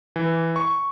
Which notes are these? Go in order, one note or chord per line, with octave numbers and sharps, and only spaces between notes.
E3
C#6